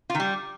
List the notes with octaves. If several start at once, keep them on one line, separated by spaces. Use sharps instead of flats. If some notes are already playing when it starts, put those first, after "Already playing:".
F4
D#3
G3